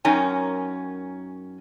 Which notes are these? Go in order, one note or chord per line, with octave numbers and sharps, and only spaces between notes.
F#2 C#4 D#4 A#4 G5 G#5